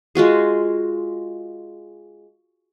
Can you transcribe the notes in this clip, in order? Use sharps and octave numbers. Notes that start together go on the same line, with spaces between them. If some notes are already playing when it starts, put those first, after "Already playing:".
G#3 F4 F#4 G#4